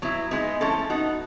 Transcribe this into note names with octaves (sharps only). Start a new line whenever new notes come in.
F#3 B3 E4
G#3 B3 D#4
F3 A3 C#4 E4 A4
B3 D#4 F#4